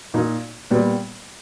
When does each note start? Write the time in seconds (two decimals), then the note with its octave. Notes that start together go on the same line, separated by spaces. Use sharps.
0.14 A#2 A#3 D#4
0.71 A#2 G3 B3